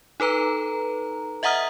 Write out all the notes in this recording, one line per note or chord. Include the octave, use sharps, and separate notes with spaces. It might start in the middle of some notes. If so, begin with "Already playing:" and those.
D#4 A4 B4 A#5
D#5 E5 F#5 A#5 D#6 F6